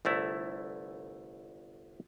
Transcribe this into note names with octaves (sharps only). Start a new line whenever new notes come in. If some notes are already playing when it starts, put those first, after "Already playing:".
G1 C2 A3 E4